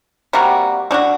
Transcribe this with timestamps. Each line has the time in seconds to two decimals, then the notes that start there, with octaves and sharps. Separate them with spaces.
0.33 C3 G3 A#3 F#4
0.91 A3 D4 F#4